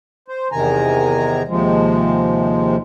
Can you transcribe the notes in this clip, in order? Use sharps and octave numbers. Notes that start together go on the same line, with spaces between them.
C5
E2 C3 D#3 G#5 A#5
D#2 C3 F3 G#3